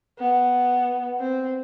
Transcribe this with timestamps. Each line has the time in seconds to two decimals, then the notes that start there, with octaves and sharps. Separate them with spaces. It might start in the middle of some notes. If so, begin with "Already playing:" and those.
0.19 B3
1.20 C4